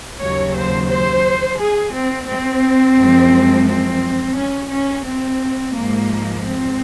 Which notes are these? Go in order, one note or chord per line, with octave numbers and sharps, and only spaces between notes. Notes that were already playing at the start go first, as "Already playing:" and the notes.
D#2 C#3 F#3 C#5
C5
C5
G#4
C4
C4
F#2 F3 G#3
C4
C#4
C#4
C4
G#2 F3 G#3 A#3
C4